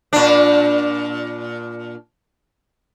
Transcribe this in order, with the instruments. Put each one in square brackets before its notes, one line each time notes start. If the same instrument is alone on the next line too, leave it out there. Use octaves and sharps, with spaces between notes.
[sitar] A#2 D4